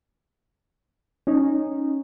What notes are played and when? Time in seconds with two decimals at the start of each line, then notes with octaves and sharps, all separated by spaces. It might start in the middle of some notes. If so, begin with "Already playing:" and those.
1.27 C#4 D#4